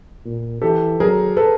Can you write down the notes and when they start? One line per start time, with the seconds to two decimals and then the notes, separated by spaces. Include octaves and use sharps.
0.25 A#2
0.62 E3 G4 A4
0.99 F#3 G#4 A#4
1.37 A4 B4